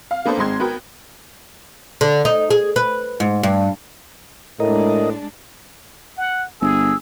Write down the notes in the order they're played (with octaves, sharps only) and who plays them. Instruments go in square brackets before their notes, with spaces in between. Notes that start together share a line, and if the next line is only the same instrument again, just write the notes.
[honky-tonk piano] F5
A#3 B3 D4 A4 C5
G#1 G#3 C4 C6 G#6
B3 F#4 A#4 G5
[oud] D3
D#4
G#4
B4
G#2
G2
[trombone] A2 [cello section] G#3 D4 [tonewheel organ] A#4 D#5
[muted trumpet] F#5
[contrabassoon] G1 [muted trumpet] G#4 [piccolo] E6